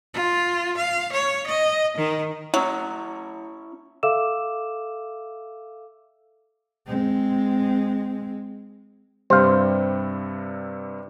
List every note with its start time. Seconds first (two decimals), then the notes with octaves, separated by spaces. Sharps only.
0.14 F4
0.77 F5
1.12 C#5
1.47 D#5
1.97 D#3
2.54 F#3 C#4 E4
4.03 A4 E5 F5 D6 E6 E7
6.87 G#3 C4
9.30 G2 C3 G3 C5 F5